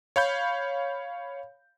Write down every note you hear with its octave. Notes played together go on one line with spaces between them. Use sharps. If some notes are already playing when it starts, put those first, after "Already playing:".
C#5 F5 B5 G6